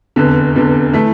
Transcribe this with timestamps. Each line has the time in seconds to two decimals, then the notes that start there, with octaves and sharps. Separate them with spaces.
0.16 F1 E2 D3
0.55 F1 E2 D3
0.93 E3 A3 E4